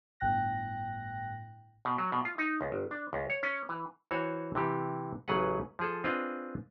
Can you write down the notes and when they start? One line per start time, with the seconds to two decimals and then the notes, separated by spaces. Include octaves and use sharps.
0.20 G1 A2 G5 F#6 A#6
1.85 B2
1.98 F#3
2.12 B2
2.25 F4
2.38 D#4
2.61 C#2
2.72 G1
2.91 D4
3.13 C#2
3.30 C#5
3.43 C#4
3.69 E3
4.11 E3 F#4 C5 C#5
4.55 C3 E3 G4
5.28 A1 C#3 F#3 G#4 B4 F#5
5.79 F3 G#4 A4
6.04 C4 D4 F4 G#4 B4 D#5